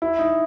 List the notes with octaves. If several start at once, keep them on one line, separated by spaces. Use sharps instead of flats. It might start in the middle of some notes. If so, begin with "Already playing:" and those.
E4
D#4